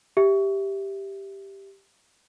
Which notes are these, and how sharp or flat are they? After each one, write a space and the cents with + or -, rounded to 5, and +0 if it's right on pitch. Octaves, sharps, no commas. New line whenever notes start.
G4 +0 E5 +0